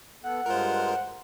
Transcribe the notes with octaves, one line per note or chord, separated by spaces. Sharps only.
B3 A4 F#5
G2 G#3 F4 A#4 C5